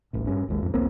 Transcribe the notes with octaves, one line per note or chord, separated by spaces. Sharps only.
D#1 A1 A2
G2 C#4
G#1 D#2 G#3
F2 G#2
B1 E2 A#3 C4